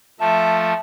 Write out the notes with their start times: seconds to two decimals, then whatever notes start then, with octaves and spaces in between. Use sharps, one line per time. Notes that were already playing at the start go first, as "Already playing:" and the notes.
0.20 F3 A3 E5 A5